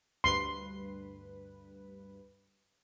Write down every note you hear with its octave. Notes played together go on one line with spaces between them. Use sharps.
D2 G2 B4 C6